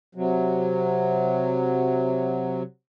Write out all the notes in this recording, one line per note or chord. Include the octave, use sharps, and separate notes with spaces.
C3 F#3